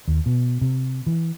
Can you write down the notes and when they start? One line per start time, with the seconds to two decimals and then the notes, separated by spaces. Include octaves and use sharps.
0.08 D#2
0.26 B2
0.61 C3
1.07 E3